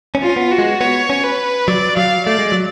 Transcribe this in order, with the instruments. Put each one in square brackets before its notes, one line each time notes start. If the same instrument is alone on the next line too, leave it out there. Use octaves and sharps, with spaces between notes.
[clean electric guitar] C#4
[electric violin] F4
[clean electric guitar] C#4
B3
[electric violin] F#4
[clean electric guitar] G#3
[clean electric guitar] B3 [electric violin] C#5
[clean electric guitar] C#4
[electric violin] B4
[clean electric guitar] F#3 [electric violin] D5
[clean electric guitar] F#3 [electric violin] F5
[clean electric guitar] A3 [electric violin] D5
[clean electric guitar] G#3
F#3